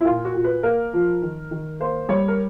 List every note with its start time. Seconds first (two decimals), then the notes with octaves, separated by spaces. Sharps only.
0.01 E4
0.05 A#2 F4
0.25 F#4
0.34 A#2
0.44 B4
0.63 A#3 A#4
0.93 F3
1.22 D#3
1.51 D#3
1.80 A#3 C5
2.09 G3 C#5
2.28 A#4